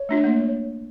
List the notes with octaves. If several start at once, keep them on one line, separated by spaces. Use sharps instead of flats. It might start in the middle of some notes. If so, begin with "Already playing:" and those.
Already playing: C#5
A3 D4 F4
A#3